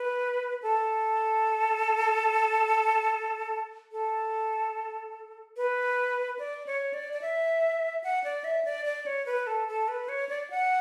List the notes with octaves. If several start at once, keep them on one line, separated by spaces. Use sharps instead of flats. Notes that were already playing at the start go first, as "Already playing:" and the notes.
Already playing: B4
A4
A4
B4
D5
C#5
D5
D5
E5
F#5
D5
E5
D5
D5
C#5
B4
A4
A4
B4
C#5
D5
F#5